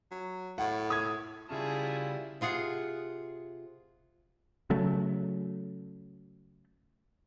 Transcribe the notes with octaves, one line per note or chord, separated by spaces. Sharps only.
F#3
A2 F#5
D#6 G#6
C#3 G3 C#4 E4 F4 G#4 A5
C3 F4 G#4 F#5
C#3 F#3 A3